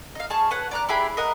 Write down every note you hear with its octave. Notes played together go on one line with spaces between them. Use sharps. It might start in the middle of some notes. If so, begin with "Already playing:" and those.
D#4 F5
G#4 A5 C#6
B4 C#5 F#5
D5 A#5 F#6
E4 G4 G#4 B5
A#4 D#5 F#5